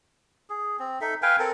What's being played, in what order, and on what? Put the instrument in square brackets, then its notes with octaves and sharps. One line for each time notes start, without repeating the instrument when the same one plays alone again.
[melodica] G#4
C4
D#4 A4 E5
B4 F5 G5 G#5
C4 A4 A#4 A5